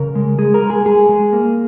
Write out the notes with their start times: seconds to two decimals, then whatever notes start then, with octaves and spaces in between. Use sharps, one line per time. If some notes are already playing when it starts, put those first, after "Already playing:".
Already playing: C#3 A#4
0.15 G#3
0.38 G#3 G#4
0.54 A#4
0.62 G#3
0.70 G#4
0.86 G#3 G#4
1.09 G#3
1.33 A#3